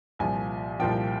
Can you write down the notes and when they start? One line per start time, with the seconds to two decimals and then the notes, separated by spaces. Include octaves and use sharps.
0.19 C2 A#2 F3 G#5
0.79 C2 A#2 F3 G5